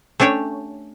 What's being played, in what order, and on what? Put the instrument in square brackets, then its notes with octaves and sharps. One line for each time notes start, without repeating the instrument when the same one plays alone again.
[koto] A3 C#4 D4 G4 C#5